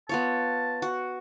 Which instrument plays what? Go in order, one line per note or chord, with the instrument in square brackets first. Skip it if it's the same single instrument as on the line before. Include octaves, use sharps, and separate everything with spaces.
[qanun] B3 F4 C#5 [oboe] A5
[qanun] F#4